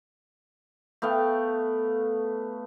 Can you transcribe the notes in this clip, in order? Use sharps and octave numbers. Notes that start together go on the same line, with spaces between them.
A3 B3 F5 G5